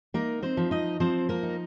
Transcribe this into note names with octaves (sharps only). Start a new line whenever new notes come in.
A#3 D#4 A#4
C4 C5
F3
D#4 D#5
F3 C4 C5
A#3 A#4
D#4